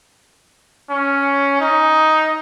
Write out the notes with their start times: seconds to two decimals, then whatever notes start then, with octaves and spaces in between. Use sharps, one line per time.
0.90 C#4
1.60 D#4